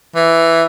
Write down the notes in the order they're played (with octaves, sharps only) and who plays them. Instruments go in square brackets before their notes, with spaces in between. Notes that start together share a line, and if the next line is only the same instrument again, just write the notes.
[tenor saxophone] E3